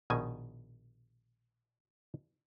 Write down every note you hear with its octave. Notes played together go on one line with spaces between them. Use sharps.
A#1 B2 D#3 G#5